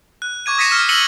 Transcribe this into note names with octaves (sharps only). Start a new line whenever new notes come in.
F#6
C#6 D6 G#6 D#7
D#6 A#6 B6 C#7 E7
F6 E7
E6 A#6 C#7 D#7 F#7 G7